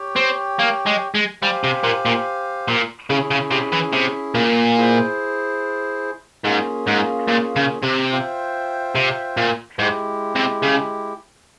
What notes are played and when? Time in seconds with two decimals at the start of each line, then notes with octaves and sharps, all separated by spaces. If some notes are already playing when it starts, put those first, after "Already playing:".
Already playing: G4 C#5 G5
0.16 C4
0.59 A#3
0.86 G#3
1.15 G#3
1.42 G3 G4 C5 F5 G#5
1.64 C3
1.84 A#2
2.05 A#2
2.68 A#2
3.10 C#3 C#4 E4 G#4
3.31 C#3
3.51 C3
3.73 E3
3.93 C3
4.35 A#2
4.77 E4 G#4 C5
6.44 G#2 A#3 C#4 F4 G#4
6.87 G#2
7.28 A#2
7.56 C#3
7.83 C3
8.12 F4 C5 E5 G5
8.95 C3
9.37 A#2
9.79 G#2 G#3 E4 G4
10.35 C3
10.62 C#3